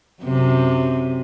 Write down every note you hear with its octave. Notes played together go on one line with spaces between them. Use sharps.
F#2 C3